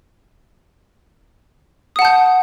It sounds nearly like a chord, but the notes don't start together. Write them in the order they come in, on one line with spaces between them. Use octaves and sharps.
D#6 F#5 A5 G6